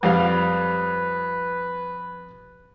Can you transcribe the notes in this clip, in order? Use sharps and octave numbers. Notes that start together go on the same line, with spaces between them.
F2 G3 B4 F5